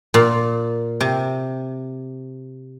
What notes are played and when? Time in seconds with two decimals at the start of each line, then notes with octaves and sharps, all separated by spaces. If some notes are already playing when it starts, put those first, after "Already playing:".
0.14 A#2
1.00 C3